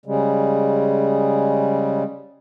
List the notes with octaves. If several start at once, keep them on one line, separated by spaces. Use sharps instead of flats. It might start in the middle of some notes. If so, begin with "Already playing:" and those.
C#3 G3 G#3